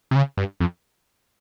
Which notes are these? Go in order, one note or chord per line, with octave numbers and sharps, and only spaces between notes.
C3
C#3
G2
F2